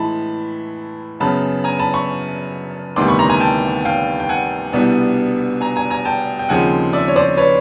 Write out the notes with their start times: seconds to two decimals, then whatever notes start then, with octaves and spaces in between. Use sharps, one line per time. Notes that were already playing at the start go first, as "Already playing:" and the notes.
Already playing: A2 E3 G#3 A5 B5
1.20 F#2 C#3 F#3 B3 A5 B5
1.64 G#5 A#5
1.79 A5 B5
1.94 B5 C#6
2.96 D2 C3 D#3 G3 B3 C6 D6
3.08 B5 C#6
3.19 A#5 C6
3.30 G#5 A#5
3.40 G5 A5
3.85 F5 G5
4.20 G5
4.29 F#5 G#5
4.73 C2 B2 G3 B3 D4
5.61 G#5 A#5
5.76 G#5 A#5
5.90 G#5 A#5
6.05 G5 A5
6.39 G5
6.49 D#2 C#3 F3 G#3 C4 F#5 G#5
6.93 D5 E5
7.08 C#5
7.16 C5 D5
7.37 B4 C#5